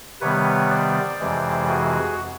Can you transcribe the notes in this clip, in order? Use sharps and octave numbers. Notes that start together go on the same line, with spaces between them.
C3 D#3 G3 B3 B4 C#5
C5 D5
F2 C3 E3 G#3
F#4 G#4